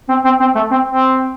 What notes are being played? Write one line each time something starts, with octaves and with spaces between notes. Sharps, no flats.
C4
C4
C4
A3
C4
C4